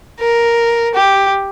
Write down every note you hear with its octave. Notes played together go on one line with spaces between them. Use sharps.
A#4
G4